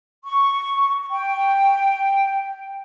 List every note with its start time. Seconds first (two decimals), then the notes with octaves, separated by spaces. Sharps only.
0.25 C#6
1.12 G5